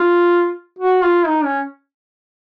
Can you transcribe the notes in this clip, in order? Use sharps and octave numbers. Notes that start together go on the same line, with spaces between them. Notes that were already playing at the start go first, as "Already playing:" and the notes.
Already playing: F4
F#4
F4
D#4
C#4